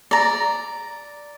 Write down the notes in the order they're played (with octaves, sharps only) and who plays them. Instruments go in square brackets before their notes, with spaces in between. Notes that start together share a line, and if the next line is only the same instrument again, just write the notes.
[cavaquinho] D5 A#5